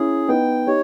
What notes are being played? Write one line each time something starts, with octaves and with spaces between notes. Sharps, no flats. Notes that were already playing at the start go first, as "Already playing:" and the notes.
Already playing: C#4 E4 G#4
B3 D#4 G5
D#4 G4 C#5